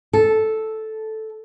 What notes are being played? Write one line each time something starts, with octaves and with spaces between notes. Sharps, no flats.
A4